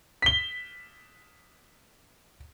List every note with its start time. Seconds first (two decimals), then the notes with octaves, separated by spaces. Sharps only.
0.22 B6 G7